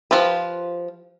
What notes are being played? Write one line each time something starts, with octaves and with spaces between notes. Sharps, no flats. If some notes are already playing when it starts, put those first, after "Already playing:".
F3 F4 G4 B4